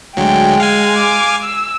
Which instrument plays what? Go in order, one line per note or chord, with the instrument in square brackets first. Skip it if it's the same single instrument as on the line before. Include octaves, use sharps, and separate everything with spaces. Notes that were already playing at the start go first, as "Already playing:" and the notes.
[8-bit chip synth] D2 F#3 [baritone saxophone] G#3 [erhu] G5
[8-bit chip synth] F5 G#5
[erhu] D6
E6